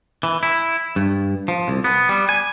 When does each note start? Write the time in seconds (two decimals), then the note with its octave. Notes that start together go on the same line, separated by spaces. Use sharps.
0.23 E3
0.43 E4
0.96 G2
1.48 F3
1.68 C2
1.84 B3
2.09 G3
2.29 G#5